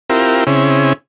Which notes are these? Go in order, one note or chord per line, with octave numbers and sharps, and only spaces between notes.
C4 E4 F4 G4 A#4
C#3 C4 C#4 E4 G#4